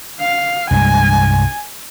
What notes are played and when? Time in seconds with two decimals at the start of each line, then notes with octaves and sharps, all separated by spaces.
0.20 F5
0.71 C2 G2 G#3 G#5